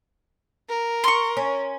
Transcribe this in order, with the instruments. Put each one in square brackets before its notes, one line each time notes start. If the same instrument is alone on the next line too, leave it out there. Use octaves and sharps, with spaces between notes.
[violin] A#4
[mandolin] C6 C#6
[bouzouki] C#4